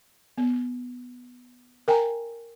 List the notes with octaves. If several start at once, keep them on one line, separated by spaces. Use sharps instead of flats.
B3
A#4 G5 G#5 A#5